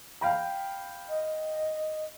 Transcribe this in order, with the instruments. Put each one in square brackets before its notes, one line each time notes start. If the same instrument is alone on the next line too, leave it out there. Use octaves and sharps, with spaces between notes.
[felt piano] F5 G5 B5
[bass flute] D#5